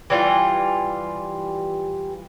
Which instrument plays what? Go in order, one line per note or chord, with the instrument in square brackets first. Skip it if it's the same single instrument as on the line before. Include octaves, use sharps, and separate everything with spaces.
[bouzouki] E3 G3 F4 G5